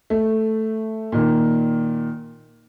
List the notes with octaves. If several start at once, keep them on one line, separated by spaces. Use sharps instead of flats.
A3
A#2 D#3